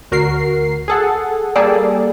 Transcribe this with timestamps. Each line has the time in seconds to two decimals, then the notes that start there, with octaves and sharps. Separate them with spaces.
0.11 D2 F#4 A#4 C7
0.88 G#4 A4 F#5
1.56 G3 A#3 G#4 A4 D5